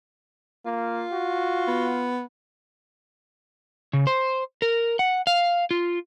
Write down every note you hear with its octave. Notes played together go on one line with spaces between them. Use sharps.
A#3 F4
F#4
B3
C#3
C5
A#4
F#5
F5
F4